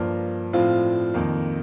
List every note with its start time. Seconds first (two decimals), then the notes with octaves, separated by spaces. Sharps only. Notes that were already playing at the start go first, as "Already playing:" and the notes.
Already playing: G2 F3 A#3
0.53 A2 F3 C4 F4
1.14 F2 D#3 A#3